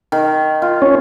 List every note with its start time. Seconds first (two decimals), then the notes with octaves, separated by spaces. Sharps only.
0.12 D#3
0.62 F4
0.82 C#4